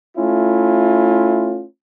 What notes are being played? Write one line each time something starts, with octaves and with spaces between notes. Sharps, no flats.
A3 C#4 E4 F4